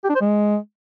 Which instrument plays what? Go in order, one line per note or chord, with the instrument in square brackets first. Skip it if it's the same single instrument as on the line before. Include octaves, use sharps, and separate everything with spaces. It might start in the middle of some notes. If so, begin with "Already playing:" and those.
[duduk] G4
D4
C5
G#3